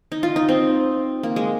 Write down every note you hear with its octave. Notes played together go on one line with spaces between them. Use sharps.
D#4
F4
D#4
C4
A#3
G#3